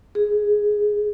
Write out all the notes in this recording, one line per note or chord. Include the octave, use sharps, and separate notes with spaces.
G#4